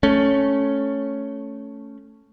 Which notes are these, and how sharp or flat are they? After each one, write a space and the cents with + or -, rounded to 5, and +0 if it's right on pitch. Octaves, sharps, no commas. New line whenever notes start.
A3 +0 C#4 +0